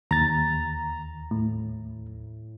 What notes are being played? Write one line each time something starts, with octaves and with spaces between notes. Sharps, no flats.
D#2 A#5 A6
A2